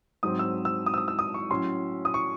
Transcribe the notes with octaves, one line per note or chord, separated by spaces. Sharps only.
G#2 F#3 C4 D#6
E6
E6
D#6
E6
D#6
E6
D#6
C#6
A2 F#3 C#4 C6
D#6
C#6